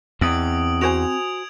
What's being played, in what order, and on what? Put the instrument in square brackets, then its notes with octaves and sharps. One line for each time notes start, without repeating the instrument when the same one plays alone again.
[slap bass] E2 [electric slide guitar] C4 D#5 G5 [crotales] D#6 D7 F#7
[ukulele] F#4 C5 G#5 [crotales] G#6 D7 F7